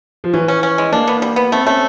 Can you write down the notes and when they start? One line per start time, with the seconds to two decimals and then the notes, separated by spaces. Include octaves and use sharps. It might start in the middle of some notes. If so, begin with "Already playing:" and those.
0.24 F3
0.33 E3 C#4
0.48 C#4
0.63 C#4
0.78 G#3
0.92 A#3 D4
1.08 B3
1.22 G3
1.36 B3
1.52 A3 C4
1.67 A3 C#4